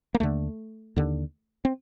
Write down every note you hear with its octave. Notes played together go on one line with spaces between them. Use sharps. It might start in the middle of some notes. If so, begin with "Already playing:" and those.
A#3
D#2 D3 A3
D#2 D3
C4